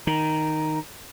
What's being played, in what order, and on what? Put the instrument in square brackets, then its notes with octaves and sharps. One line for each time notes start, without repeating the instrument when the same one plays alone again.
[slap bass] D#3 [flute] A#5